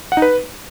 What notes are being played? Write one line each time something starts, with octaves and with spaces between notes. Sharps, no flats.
F#5
D#4
B4